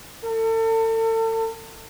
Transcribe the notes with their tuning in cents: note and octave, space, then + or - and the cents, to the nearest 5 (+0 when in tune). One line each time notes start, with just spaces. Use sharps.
A4 +35